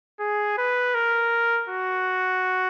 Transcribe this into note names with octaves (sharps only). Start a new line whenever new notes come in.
G#4
B4
A#4
F#4